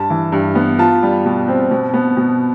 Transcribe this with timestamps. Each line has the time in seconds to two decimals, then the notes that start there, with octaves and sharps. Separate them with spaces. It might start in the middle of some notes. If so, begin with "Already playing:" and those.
Already playing: G2 A5
0.10 E3
0.32 G2
0.55 B3
0.79 F4 A5
1.03 G3
1.25 B2
1.48 C4
1.71 B2
1.94 B3
2.17 B2